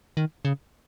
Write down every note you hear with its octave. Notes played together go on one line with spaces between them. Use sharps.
D#3
C#3